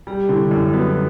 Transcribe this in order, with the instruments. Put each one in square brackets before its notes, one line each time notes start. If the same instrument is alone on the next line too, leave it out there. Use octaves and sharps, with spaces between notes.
[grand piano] G3 [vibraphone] G4
[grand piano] D3 [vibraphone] E4
[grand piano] F#2 [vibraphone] E4
[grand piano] B3 [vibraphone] F#4